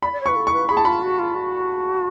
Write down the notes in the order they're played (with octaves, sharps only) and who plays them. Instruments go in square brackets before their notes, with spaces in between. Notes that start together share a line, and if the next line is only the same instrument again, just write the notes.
[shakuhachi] D5 [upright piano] B5
[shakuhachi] D5
C#5
[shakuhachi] B4 [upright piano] C#6
[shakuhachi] A4
[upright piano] C#6
[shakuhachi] B4
[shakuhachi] G#4 [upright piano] B5
[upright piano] A5
[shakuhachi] F4 [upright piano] B5
[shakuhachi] F#4
F4
F#4